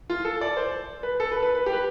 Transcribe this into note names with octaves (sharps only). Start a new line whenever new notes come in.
F4
A4
D5
C5
B4
A4
B4
B4
B4
G4
B4